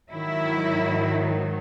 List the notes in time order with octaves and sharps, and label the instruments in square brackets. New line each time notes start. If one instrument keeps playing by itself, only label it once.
[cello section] G#2 D#3 F#3 E4